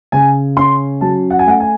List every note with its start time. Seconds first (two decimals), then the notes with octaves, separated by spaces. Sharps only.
0.12 C#3 G#5
0.57 C#4 C6
1.01 F#3 A5
1.30 F#5
1.39 G#5
1.46 A3 F#5
1.60 G#5